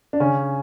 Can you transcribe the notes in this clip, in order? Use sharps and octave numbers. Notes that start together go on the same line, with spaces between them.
D4
C#3 C#4